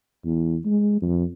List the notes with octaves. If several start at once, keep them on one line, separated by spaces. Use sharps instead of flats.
E2
G#3
F2